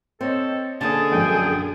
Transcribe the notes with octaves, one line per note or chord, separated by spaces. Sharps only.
C4 A4 C5 C#5 D#5
D3 A#3 C#4 G#4 A4 A5
A#1 F#2 G5